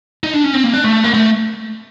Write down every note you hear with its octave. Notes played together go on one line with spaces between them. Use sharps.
D#4
D4
C#4
C4
A#3
D4
A3
A#3
A3